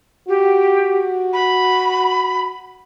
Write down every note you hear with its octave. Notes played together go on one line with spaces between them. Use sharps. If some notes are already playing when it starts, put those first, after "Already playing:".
F#4 G4
B5